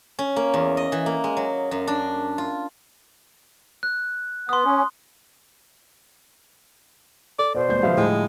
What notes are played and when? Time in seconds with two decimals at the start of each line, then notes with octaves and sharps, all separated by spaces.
0.19 C#4
0.36 A#3
0.54 E2
0.77 D#5
0.92 E3
1.06 A#3
1.24 G#3
1.37 F#3
1.71 F#2
1.87 D4
2.38 F4
3.83 F#6
4.49 B3 C6 D#6
4.65 C#4
7.39 A4 D5
7.55 B2 C5 D5
7.68 D#1 G#1 G6
7.83 D3 F3 G3 B4 E5 F5
7.97 A2 G#3